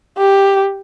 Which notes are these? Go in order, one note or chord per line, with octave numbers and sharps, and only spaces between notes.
G4